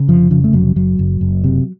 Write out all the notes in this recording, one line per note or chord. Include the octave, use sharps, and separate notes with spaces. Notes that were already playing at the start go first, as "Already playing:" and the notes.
Already playing: C#3
F1 F3
C#3 F3
A3
F1 F#3
F#1 F#3
F#1
F#1
C3